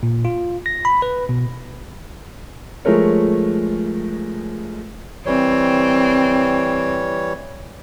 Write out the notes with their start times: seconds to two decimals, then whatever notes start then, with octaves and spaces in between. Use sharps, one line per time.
0.03 A#2
0.25 F4
0.66 A#6
0.85 B5
1.02 B4
1.29 B2
2.85 F3 G#3 A3 A#4 C#5
5.26 E3 G3 C4 C#5